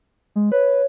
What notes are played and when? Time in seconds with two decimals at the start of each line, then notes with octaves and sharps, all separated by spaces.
0.36 G#3
0.52 B4 C#5